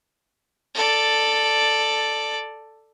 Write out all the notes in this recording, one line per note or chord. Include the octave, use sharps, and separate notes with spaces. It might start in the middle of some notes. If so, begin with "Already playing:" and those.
A4 D5